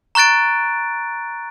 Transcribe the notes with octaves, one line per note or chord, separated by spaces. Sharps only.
A#5 C#6 F#6 A6 D7